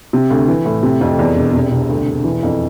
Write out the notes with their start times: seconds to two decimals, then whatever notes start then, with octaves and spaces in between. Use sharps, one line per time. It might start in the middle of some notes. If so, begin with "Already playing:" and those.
0.13 C3
0.30 D2
0.48 E3
0.65 A2
0.83 C3
1.01 F2
1.19 E2
1.37 E1
1.53 C3
1.71 C2
1.90 D2
2.06 E1
2.24 E3
2.43 F2